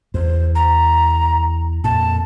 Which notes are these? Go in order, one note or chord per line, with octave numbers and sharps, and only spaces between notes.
E2 C5
A#5
F2 A#2 A5